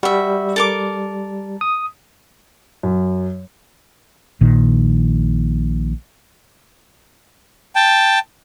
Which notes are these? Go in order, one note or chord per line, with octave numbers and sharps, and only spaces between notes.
G3 F#4 E5
A4 A#4 D6
D#6
F#2
A#1 A#2 D#3
G5 A5